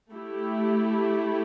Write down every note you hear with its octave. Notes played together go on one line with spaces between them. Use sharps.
A3 E4 G4